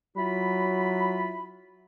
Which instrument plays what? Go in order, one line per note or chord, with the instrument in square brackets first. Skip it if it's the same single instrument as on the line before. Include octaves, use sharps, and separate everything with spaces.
[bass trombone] F#3 [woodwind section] E4 F4 B5